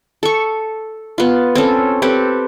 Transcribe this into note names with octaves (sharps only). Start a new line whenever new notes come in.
A4 C#6
B3 F4
C4 C#4 A4
C4 G4 A4 B4